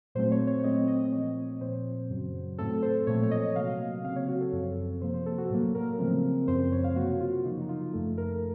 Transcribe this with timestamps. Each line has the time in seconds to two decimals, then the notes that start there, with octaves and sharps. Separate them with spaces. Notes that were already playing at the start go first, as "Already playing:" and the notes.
0.15 A#2 F#3 A3 C4 C5
0.32 C#5
0.47 C#5
0.64 A#2 A3 C4 D#5
0.88 D#5
1.05 D#5
1.12 A#2 F3 C4 C#5
1.61 A#2 F3 C4 C5
2.09 F#2 C#3 F#3
2.58 A2 F#3 A3 C4 A4
2.82 C5
3.07 A#2 F3 A3 C4 C#5
3.23 C#5
3.31 D#5
3.56 C3 F#3 A#3 F5
4.04 C#3 F#3 C4 F5
4.16 C#5
4.28 F#4
4.41 A4
4.53 F#2 F3 C4 A4
5.01 C3 F3 A#3 C5
5.14 C5
5.26 A4
5.38 F#4
5.50 A2 F#3 A#3
5.75 A#4
5.99 C#3 F3 A3 C4
6.48 F#2 C#3 F3 C4 C5
6.60 C5
6.72 C#5
6.84 F5
6.96 C3 F#3 A#3 F#4
7.21 F4
7.45 C#3 F3 A#3 D#4
7.61 D#4
7.69 F4
7.93 F#2 F3 A3 A4
8.18 A#4